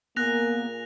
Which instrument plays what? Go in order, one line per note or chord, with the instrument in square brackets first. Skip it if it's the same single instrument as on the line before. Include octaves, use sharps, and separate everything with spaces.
[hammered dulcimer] A#2 G#4 [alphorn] A#3 [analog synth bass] B3 [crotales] F#6 A#6 F7